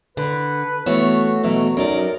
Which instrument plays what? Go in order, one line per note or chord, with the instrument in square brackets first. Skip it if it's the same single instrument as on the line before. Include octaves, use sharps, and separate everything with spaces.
[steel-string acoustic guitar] D3 [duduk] B4
[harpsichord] E3 B3 [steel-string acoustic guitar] A3 C#5 [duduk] F#4
[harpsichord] B2 E3 [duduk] F#3
[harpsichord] F#2 D#4 D5 [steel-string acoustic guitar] A#4